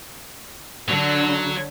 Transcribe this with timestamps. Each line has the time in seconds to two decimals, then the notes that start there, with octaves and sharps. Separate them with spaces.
0.88 D3 F#3